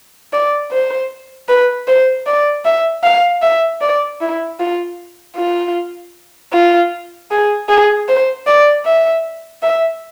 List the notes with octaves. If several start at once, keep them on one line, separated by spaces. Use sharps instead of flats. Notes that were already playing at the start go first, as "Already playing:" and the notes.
D5
C5
B4
C5
D5
E5
F5
E5
D5
E4
F4
F4
F4
G#4
G#4
C5
D5
E5
E5